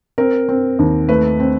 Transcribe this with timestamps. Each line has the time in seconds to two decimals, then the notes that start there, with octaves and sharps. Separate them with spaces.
0.18 C4 A#4
0.49 C4
0.79 D#2
1.09 A3 B4
1.40 C4